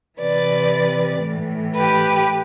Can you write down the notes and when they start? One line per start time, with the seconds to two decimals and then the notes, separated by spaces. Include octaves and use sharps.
0.19 C3 E3 B4 D5
1.24 A2 E3
1.75 G4 B4